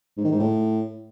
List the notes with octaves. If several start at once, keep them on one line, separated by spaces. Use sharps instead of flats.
G#2
D#3
G#2
A2